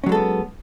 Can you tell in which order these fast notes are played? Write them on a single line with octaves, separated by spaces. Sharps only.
C#4 F#3 G#3 A4 B3